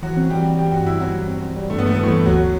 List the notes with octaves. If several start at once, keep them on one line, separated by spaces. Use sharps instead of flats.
E3 F#3 F#4
C4
E3 G3 G4
E3
E3 G4
G2 F#4
G3 E4
F#3 C4 F#4
G3
C4
C4
G3
G2 A3
B3
G2 A3
E3 B3
A2 A3
G2
D2 F#3 F#4